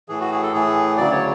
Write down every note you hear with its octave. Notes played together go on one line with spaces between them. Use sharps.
A2 E3 G#4
F#4
G#4
A4
A2 E3 G#4
D2 C#3 F#3 D5
C#5